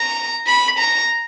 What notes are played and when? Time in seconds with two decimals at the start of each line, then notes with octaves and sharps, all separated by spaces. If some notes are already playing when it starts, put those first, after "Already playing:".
Already playing: A#5
0.47 B5
0.79 A#5